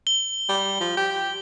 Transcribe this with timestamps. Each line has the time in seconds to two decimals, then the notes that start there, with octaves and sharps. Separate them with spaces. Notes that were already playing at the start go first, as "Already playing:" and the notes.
0.07 G7
0.49 G3
0.80 F3
0.97 G4